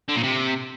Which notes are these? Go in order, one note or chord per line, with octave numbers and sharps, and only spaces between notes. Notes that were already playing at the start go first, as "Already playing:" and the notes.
D3
A#2
C3